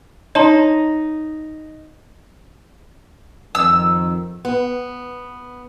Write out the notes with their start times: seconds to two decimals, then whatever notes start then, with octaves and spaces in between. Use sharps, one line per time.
0.35 D#4 C#5 A5 C6
3.55 F2 D#3 E6
4.45 B3